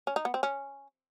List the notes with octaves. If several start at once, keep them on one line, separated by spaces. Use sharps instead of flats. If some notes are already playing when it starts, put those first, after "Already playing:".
C#4
D#4
B3
C4
C#4